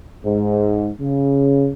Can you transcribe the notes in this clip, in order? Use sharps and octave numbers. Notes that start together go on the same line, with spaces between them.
G#2
C#3